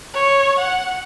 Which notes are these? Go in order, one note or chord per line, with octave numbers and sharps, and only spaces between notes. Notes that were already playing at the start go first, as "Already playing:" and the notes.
C#5
F#5